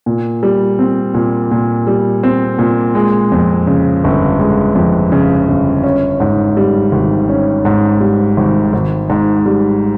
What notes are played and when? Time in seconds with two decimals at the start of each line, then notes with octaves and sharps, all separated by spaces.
0.06 A#2
0.43 G3
0.79 C4
1.14 A#2
1.51 A#2
1.87 G3
2.23 C4
2.59 A#2
2.95 G#3
3.32 F2
3.67 C#3
4.04 G1
4.39 G#3
4.75 F2
5.12 C#3
5.48 G1
5.84 C#4
6.20 G#2
6.57 G3
6.92 G#1
7.29 C#4
7.65 G#2
8.01 G3
8.37 G#1
8.73 G#1
9.10 G#2
9.46 G3